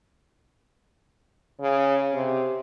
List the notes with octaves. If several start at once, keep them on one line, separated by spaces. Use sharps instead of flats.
C#3
C3